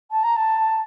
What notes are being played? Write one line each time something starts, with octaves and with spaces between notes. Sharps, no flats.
A5
A#5
A5